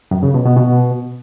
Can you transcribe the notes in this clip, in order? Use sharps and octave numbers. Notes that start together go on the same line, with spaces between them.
F#2
C#3
B2
B2
B2